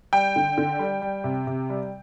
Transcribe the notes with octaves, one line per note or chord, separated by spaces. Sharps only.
G3 G5
D3
D3
G3
G3
C3
C3
G3